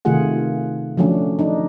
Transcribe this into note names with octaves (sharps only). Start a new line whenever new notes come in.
C3 D#3 A3 F4 G#4 F#5
D3 F3 F#3 A3 C#4 D4
D4 D#4